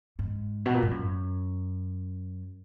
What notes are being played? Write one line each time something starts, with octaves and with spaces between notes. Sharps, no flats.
G#2
B2
A#2
G#2
F#2